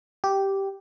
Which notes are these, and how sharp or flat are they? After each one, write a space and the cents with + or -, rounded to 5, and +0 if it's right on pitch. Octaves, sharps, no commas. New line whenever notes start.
G4 -5